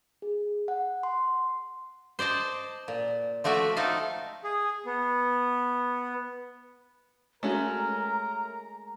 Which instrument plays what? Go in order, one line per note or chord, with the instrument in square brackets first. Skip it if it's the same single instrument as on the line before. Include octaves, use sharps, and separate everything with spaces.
[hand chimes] G#4
F#5
C6
[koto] C5 D5 D#5 A5
A#2
F3 A3 F#4 D5 E5
F3 A3 D#4 A4 F5
[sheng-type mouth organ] G#4
B3
[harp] G#3 [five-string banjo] A3 C#4 F#4 [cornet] A#4 [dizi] A#5